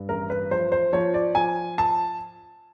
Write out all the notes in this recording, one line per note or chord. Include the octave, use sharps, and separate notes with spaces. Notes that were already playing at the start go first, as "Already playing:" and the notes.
Already playing: G2
A1 A#4
B4
F3 C5
C5
F3 C#5
D5
F3 G#5
A5